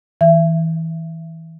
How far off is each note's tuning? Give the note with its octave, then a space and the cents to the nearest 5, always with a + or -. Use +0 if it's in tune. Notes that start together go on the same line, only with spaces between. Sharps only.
E3 -30 E5 +30